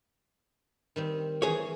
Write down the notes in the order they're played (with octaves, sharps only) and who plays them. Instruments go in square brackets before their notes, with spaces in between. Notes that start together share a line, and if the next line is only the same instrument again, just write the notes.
[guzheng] D#3 G3 C4
[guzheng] E3 C5 [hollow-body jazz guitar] G#4 C#5